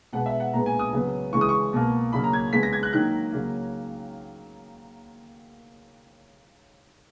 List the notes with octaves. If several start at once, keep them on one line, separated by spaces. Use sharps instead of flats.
B2 G#3 B3 F#5
E5
F#5
A#2 G#3 B3 A#5
G#5
D#6
C#3 F#3 B3
C#3 E3 G#3 C#6
D#6
C#6
B2 A#3
C#3 F#3 A#3 B5
A#5
G#6
C#3 G#3 B3 B6
A#6
G#6
F#6
D#3 F#3 A#3 F#6
C#3 F#3 A#3